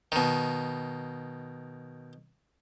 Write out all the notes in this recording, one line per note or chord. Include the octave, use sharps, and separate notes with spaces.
B2 D#3